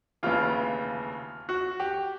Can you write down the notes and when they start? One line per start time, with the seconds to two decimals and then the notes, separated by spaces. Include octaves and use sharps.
0.23 F1 D#2 C#3 E3 F4
1.49 F#4
1.80 G4